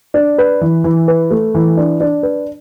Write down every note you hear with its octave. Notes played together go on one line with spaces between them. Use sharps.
D4
B4
E3
E3
B4
A3
E3
D4
D4
B4